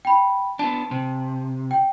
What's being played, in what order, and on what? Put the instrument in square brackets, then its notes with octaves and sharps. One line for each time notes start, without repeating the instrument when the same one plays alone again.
[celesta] G5 B5
[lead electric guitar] B3 D4 [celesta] A5
[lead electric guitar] C3
[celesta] G5